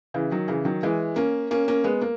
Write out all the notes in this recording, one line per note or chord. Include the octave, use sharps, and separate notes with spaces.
C#3 E3
D#3 F#3
C#3 E3
D#3 F#3
E3 G#3
A#3 C#4
A#3 C#4
A#3 C#4
G#3 B3
A#3